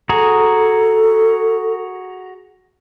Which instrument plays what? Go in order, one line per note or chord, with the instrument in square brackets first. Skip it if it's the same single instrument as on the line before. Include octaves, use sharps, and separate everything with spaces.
[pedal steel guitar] F#4 G#4 A#5 [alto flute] A4